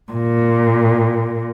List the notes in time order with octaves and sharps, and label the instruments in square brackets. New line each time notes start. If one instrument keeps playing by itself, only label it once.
[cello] A#2